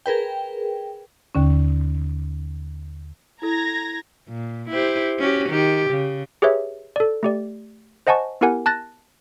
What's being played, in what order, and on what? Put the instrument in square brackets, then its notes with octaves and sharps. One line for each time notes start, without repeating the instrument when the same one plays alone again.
[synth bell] G#4 A#4 B4 G5
[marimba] D#2 D3 C#4
[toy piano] E4 A4 [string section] A#5 G#6 A#6
[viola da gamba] A#2
E4 G4 C5
C#4 F#4 G4
D#3 G4
C#3
[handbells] G4 G#4 B4 C#5 E5
A4 D5
A3 G4 D5
C5 D#5 F#5 G#5 A5 C#6
B3 E4 G4 A#4 F#5 G#5
A5 F#6 A6 A#6